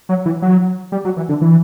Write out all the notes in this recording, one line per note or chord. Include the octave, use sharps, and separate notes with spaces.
F#3
E3
F#3
G3
F#3
E3
D3
E3